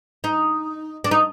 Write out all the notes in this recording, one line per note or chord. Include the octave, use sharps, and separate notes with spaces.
D#4
D4
D#4